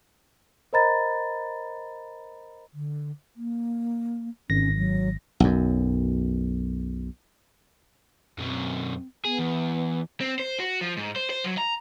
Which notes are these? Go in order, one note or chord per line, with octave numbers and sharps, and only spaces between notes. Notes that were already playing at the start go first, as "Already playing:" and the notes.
A#4 C5 D#5 A#5 B5 A6
D3
A#3
G#1 C#4 A#6
F#3
B1 F#2
F#2 B2 C4
B3 G#4
E2
C4
C5
F#4
F3
G#2
C5
C5
F#3
A#5